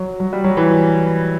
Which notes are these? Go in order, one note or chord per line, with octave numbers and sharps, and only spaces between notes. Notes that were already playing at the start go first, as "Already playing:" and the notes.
Already playing: F#3
F#3
G3
F#3
E3